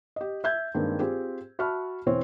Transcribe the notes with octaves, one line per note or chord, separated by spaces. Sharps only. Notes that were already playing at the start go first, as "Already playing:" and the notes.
G4 D#5
E5 G6 G#6
G2 D#3 G#3 A#3 C4
C4 F4 G4 G#4
F#4 E5 A5 B5 C#6 F6
E1 E3 C4 C#5